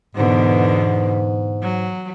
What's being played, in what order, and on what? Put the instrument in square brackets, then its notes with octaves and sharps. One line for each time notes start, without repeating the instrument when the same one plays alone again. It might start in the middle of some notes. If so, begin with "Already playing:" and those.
[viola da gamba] E2 B2 D3 [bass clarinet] G#2
[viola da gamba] F#3